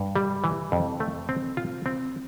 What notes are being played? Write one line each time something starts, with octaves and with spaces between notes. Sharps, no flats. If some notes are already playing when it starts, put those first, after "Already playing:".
Already playing: G2
G3
E3
F2
A3
C4
F4
C4